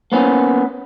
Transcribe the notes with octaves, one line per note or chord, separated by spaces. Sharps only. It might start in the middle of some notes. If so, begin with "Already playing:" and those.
A#3 B3 C#4